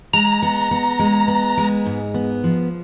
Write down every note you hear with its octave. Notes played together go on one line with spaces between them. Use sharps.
G#3 A#5
B3
B3
G#3
B3
G#3
G#2
B3
F3